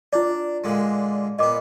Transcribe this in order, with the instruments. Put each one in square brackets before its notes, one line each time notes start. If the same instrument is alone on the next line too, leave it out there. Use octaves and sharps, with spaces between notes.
[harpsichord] D4 [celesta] F4 D5
[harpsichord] A#2 D3 G#3
[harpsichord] A#2 B3 [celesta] D#5 D6